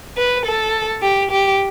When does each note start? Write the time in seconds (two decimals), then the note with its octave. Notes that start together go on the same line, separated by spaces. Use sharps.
0.17 B4
0.45 A4
1.02 G4
1.31 G4